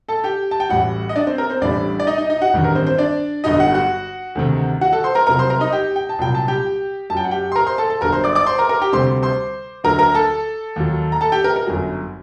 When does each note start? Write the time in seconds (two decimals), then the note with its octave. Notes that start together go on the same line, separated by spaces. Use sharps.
0.08 A4 A5
0.24 G4 G5
0.51 A5
0.60 G5
0.69 A1 A2 G3 F#4 F#5
1.09 D#5
1.16 D4 D5
1.27 C4 C5
1.38 A#4
1.50 C4 C5
1.61 A1 A2 G3 D4 D5
2.00 D5
2.07 D#4 D#5
2.18 D#4 D#5
2.30 D#4 D#5
2.42 F#4 F#5
2.53 A1 G2 D#3 G3
2.64 A#4
2.75 C4 C5
2.86 C4 C5
2.98 D4 D5
3.44 G1 G2 D3 F#3 D#4 D#5
3.59 F#4 F#5
3.74 F#4 F#5
4.35 D2 C3 D#3
4.81 F#4 F#5
4.93 A4 A5
5.04 C5 C6
5.15 A#4 A#5
5.27 C2 C3 F#3 A#4 A#5
5.39 C5 C6
5.50 A#4 A#5
5.61 D#4 D#5
5.72 G4 G5
5.96 G5
6.09 A5
6.18 C2 A#2 F#3 G5
6.35 A5
6.48 G4 G5
7.10 F#2 A5
7.14 F#3 G5
7.24 F#5
7.31 G4 G5
7.52 C6
7.56 A#4 A#5
7.66 C5 C6
7.78 A4 A5
7.90 A4 A5
8.01 G1 G2 F#3 A#4 A#5
8.12 C5 C6
8.24 D5 D6
8.35 D5 D6
8.46 C5 C6
8.58 A#4 A#5
8.69 A#4 A#5
8.82 G4 G5
8.93 D2 C3 G3 C5 C6
9.22 C5 C6
9.84 D2 D3 F#3 A#4 A#5
9.99 A#4 A#5
10.15 A4 A5
10.76 D#2 D#3 F#3
11.12 A#5
11.21 A4 A5
11.32 G4 G5
11.44 A#4
11.56 A#4
11.66 G1 F#2 F#3